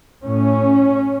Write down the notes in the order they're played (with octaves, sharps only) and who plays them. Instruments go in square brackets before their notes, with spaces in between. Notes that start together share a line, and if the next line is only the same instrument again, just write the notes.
[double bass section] A2 C#4